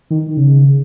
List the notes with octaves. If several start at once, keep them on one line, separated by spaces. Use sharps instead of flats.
D#3
C#3